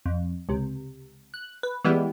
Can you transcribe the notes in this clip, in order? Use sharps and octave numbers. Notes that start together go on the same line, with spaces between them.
F2
C#2 C3
F#6
B4
E3 G3 G#3 B3 E4 G4